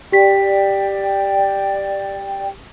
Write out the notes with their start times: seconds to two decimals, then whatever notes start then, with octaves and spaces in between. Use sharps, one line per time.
0.12 G4 D5 G5 B6